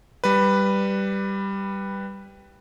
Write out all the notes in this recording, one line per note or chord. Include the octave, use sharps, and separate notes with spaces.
G3 B4